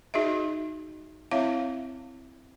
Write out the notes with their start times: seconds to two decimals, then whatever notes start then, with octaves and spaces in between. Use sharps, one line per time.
0.14 D#4 F#4 G#4 D#5 E5
1.31 C4 E4 C#5 E5 F5